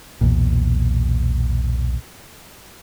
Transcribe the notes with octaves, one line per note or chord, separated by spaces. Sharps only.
B1 E2 A#2